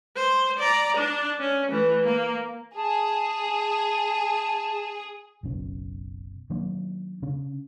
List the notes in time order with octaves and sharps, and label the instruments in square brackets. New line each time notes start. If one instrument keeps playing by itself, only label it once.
[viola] C5
D5 A#5
D4
C#4
E3 A3
A#3
[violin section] G#4 [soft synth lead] A5
[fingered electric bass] F#1 B1 C#4
D#3 F#3 A#3 D4
C#3 C#4 D4